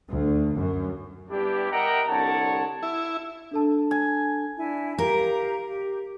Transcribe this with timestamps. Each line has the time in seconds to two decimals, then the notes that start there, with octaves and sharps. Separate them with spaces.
0.10 D2
0.55 F#2
1.30 G3 B3 D4 E4 G4
1.72 A#4 D#5 E5 F#5 G5 A#5
2.08 C2 D3 C#5 F#5 A5
2.83 E4
3.51 D4 A4 A5
3.91 G#5
4.56 D4 E4 G#5
4.98 G4 A#4 F5 A#5
5.66 G4